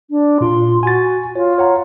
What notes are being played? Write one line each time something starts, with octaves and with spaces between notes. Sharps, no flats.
D4
A#2 F4 C6
F#4 G#5 A6
F4 C#5
C#5 F#5 A#5